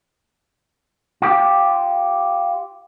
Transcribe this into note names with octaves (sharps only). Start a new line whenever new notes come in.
F4 G4